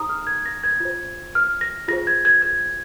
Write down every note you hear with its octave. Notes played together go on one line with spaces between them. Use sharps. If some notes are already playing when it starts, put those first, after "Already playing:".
Already playing: D#4 G#4 C5 A#5 D#6
F6
G#6
A#6
G#6
F4 C5
F6
A#6
F4 G#4 C5 A#6
G#6
G#6
G#6